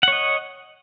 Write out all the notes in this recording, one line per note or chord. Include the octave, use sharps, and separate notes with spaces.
C#5 D#5 F#5